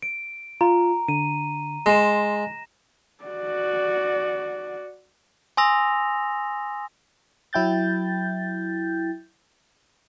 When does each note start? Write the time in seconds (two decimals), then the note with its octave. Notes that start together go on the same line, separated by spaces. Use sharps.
0.02 D7
0.61 F4 A#5
1.08 D3 D#7
1.86 G#3 C6 A#6 E7
3.25 F#4 D5
5.57 G#5 C6 D#6 E6 A#6 F7
7.53 F#3 E4 G5 G6 A6